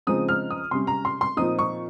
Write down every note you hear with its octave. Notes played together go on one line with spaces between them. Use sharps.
C#3 F3 G#3 C4 D#4 D#6
F6
D#6
C3 G3 C#4 C6
A#5
C6
C6
A#2 F3 C4 D#4 D#6
C#6